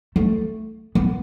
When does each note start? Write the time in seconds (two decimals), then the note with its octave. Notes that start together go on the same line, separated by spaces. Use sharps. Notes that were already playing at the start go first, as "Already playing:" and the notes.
0.16 A3
0.95 B3